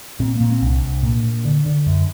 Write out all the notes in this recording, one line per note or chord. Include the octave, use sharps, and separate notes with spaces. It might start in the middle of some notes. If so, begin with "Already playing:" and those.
A#2 C4
A#2 A#3
C4
C2
D4
C2
A#2
A#2
D3
D3
F#2